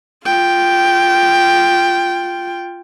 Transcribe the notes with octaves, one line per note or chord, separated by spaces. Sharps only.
F4 G5